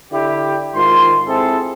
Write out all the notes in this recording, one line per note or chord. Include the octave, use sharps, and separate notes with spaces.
D3 E4 G4
G#2 D#3 F4 C6
C4 E4 G#4 A4